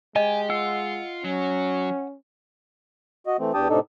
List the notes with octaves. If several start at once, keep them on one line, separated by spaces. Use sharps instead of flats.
G#3 G4 D#5 G#5
F4 F#5 E6
F#3 C#4
F#4 D#5
E3 A3 C4
E2 D4 G4 G5 A5 D#6
A2 C3 D4 D#4 A4